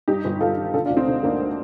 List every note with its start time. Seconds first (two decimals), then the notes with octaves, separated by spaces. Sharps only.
0.08 G2 D#4 G4
0.25 G1
0.41 G1 F4 A4
0.57 D#3
0.74 D3 F4 A4
0.85 D4 F4
0.90 D2
0.96 C4 D#4
1.07 D3
1.23 D2 A#3 D4